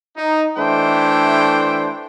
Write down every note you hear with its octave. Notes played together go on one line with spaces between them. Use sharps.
D#4
E3 A3 D4 C5 G5